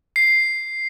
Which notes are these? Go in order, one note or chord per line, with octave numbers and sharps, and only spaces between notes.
C7